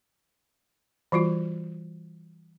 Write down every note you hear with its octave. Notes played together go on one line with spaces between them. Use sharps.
E3 G3 F4 F#4